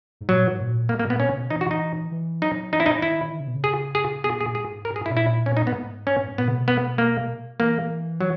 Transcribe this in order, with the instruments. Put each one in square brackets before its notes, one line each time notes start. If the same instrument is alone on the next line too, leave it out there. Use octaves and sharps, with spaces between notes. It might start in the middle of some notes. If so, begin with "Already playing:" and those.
[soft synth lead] G#2
[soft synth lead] A#2 [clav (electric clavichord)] F#3
[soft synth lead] G#2
A#2
[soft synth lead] G#2 [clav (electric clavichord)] A#3
[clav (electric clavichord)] A#3
[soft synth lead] A#2 [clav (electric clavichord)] B3
[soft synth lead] B2 [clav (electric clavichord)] C#4
[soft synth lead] C#3
B2
[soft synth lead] E3 [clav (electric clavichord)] D#4
[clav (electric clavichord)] F#4
[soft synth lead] E3 [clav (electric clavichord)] D#4
[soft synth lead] E3
[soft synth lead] F#3 [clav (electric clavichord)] D#4
[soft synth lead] E3 [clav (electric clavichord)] D#4
[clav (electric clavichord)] E4
D#4
[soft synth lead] D#3 [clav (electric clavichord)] E4
[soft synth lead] D#3
C#3
B2
C#3
[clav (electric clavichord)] G#4
G#4
[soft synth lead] B2 [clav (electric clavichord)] G#4
[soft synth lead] A#2 [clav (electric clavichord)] G#4
[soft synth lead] G#2 [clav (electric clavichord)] G#4
[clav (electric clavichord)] A#4
G#4
E4
[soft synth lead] B2
[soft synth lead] A#2 [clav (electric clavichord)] E4
[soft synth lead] A#2 [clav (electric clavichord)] C#4
[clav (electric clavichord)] D#4
[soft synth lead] G#2 [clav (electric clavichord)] B3
[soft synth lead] G#2
[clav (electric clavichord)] C#4
[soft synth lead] G#2
[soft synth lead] A#2 [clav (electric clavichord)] B3
[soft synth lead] C#3
B2
[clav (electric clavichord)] B3
A#3
[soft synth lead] E3 [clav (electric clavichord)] A#3
[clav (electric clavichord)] F#3